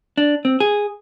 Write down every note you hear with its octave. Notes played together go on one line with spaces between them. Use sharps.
D4
C4
G#4